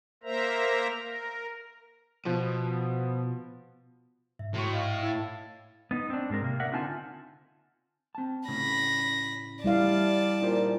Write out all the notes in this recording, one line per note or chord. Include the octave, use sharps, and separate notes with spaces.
A#3 A#4 C5 E5 A#5
A#4
B2 F3 B3
G#2 E5
A2 F#4 C6 C#6
D#5 F5 F6
E4 F5 E6 G#6 A6
B3 D#4
C4 D4
G#2 G#3 C4 A#4
C3 A#3
A#4 D5 E5 F#5
D3 C4 D#4 F4 G#5 A5
C4 A5
A2 C#3 C#4 B5 A#6
G3 E4 D5 F5 A5
A#2 D#4 F4 C5